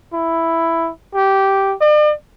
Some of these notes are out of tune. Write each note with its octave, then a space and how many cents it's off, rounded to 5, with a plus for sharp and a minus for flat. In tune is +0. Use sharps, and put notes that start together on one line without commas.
E4 +5
G4 -10
D5 +45